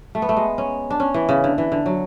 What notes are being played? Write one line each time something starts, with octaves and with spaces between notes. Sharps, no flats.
A3
B3
A3
G#3
C#4
D4
C#4
E3
C#3
D3
E3
D3
F#3